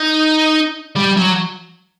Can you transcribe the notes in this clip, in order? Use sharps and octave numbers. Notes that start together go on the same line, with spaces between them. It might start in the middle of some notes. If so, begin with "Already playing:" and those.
Already playing: D#4
G3
F#3